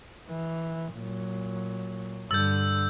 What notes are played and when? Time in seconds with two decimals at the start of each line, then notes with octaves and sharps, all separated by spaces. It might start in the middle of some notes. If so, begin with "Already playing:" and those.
0.28 E3
0.94 A#2 F#3
2.31 G2 D3 G3 E6 G6 A6